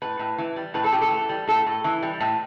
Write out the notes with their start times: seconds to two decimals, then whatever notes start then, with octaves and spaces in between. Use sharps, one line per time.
0.02 A2 B4
0.19 A2
0.38 E3
0.56 G3
0.74 A2 B4
0.84 A4
0.92 A2 G4
1.02 A4
1.11 E3
1.29 G3
1.47 A2 A4
1.66 A2
1.84 E3
2.03 G3
2.20 A2